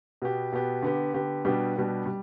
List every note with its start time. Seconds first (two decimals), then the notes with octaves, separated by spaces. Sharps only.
0.22 B2 B3 G4
0.52 B2 B3 G4
0.82 D3 B3 G4
1.14 D3 B3 G4
1.45 B2 G3 B3 D4 G4
1.76 B2 G3 B3 D4 G4
2.06 G3